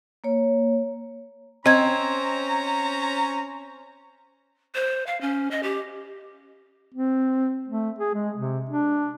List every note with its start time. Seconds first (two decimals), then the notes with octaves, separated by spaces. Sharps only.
0.24 A#3 C#5
1.66 C4 C#4 C5 D#5 A#5 G#6
4.75 C5
5.07 F5
5.21 C#4
5.51 D#5
5.63 G4
6.94 C4
7.68 A3
7.99 G#4
8.14 G#3
8.37 C3
8.69 D4